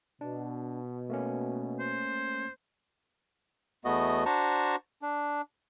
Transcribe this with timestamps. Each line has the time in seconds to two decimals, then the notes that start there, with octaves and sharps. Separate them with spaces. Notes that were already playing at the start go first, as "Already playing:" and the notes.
0.21 B2 D4
1.10 A3 A#3 C#4
1.79 C5
3.85 E2 A3 B3 F#4 D#5
4.26 D4 F#4 C5 A5 A#5 C#6
5.02 D4